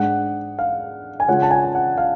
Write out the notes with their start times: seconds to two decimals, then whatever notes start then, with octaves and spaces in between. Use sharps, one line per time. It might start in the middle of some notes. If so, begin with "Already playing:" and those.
Already playing: G#2 G#3 D4 F#5
0.59 F5
1.20 G#5
1.28 C#3 G#3 C#4 F4 F#5
1.42 A5
1.51 G#5
1.75 F#5
1.98 F5